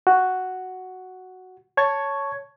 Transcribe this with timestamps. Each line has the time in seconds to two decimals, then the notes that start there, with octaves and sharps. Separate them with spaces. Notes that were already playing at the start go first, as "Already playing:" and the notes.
0.07 F#4
1.77 C#5 A5 C#6 G#6